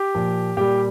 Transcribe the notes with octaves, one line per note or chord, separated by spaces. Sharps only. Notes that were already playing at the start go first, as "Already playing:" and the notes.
Already playing: G4
A#2 F3
A#2 G3 G4